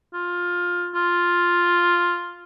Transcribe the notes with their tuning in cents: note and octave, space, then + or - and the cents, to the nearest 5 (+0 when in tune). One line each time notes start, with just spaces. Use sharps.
F4 +15
F4 +0